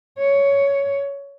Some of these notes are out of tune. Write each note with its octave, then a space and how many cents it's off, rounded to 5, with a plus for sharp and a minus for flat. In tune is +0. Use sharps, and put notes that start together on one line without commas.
C#5 +10